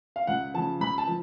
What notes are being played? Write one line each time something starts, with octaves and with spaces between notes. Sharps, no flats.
F5
C#2 F#5
C#3 F3 A5
C#2 B5
A5
F3